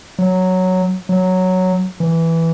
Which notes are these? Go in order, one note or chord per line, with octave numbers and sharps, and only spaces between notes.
F#3
F#3
E3